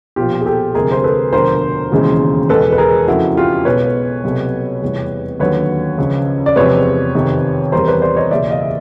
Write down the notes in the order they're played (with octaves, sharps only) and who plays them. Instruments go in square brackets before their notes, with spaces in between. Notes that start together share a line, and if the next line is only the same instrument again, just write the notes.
[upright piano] B1 A#2 F3 F4 G4
G#4
G4 A4
D2 C3 F3 G#3 G#4 A#4
C5
A4 B4
E1 D2 D3 F3 A#4 C5
E1 D#2 C#3 E3 G#3
E2 B2 G#3 A4 B4
B4
G#4 A#4
F2 C#3 F3 A3 E4 F#4
F4 G4
B1 B2 G#3 B4 C#5
C2 B2 F#3 A3
F1 E2 C3 E3 G3
D#2 D3 F#3 B4 C#5
C#2 C#3 F3
D5
E2 C3 F3 G#3 B4 C#5
F2 C3 D#3
E2 C3 E3 G3 A#4 C5
B4 C#5
C5 D5
C#5 D#5
F#1 E2 B2 D5 E5
D#5 F5
E5